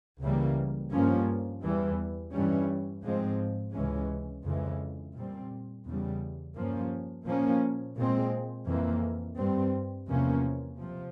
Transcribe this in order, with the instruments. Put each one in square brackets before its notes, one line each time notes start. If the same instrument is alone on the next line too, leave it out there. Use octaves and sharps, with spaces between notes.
[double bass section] C#2 C#3 E3 G3 A#3
G2 F3 A#3 C#4
E2 E3 G3
G2 E3 G3 C#4
G#2 F3 G#3 C4
C#2 C3 E3 G#3 C#4
F2 C#3 E3 G#3
A#2 G3 C4
E2 C#3 G3
G2 F3 A#3 C#4
A#2 F3 A#3 C#4
A#2 G#3 C4
F2 E3 A#3
G2 G3 C4
E2 C3 F3 A#3 C#4
C3 F3